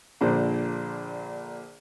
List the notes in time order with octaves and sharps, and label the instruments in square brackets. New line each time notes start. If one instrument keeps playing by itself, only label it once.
[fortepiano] A#1 A#2 D3 C5